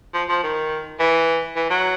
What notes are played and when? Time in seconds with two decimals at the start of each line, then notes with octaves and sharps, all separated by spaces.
0.14 F3
0.29 F3
0.43 D#3
1.00 E3
1.56 E3
1.70 F#3